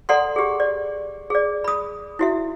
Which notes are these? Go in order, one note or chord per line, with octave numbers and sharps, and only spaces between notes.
A4 D5 F#5 A#5 C6
G4 G#4
D5
G#4 D5
B5 D#6
E4 F#4 E5